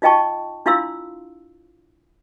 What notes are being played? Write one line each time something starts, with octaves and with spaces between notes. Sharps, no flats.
D#4 F4 D#5 G5 A5 C#6
D4 E4 F4 F5 C6 E6